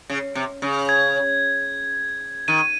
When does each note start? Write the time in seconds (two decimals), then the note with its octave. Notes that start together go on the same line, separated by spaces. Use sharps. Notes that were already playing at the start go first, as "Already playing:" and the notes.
0.10 C#3
0.35 C3
0.62 C#3
0.89 G#6
2.48 D#3 D#7